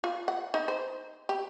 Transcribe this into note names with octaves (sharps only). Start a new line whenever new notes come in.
F4
F#5
D#4
C5
G4